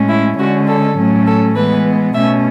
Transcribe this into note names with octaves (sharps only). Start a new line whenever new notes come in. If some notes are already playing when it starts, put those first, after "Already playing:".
Already playing: A2 G#3 C#4
E4
D3 G#3 C#4 F#4
A4
A2 F#3 A3 C#4
A4
E3 G#3 B3 B4
B2 A3 C#4 E5